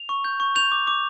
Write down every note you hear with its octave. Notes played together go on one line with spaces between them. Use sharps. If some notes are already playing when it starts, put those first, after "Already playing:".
Already playing: F7
C#6
G6
C#6
G6 F7
D6
D6